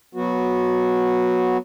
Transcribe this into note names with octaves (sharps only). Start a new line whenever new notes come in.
F#3 B3 F#4